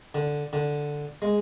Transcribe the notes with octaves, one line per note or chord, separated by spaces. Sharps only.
D3
D3
G#3